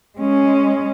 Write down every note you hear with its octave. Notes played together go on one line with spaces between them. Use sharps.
G#3 C#4